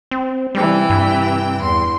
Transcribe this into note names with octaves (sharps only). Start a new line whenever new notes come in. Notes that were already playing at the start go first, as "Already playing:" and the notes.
C4
C3 E3 G3 G5
G2
E2 C6